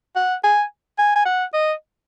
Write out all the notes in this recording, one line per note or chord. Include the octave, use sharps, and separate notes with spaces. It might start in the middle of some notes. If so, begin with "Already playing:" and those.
F#5
G#5
G#5
G#5
F#5
D#5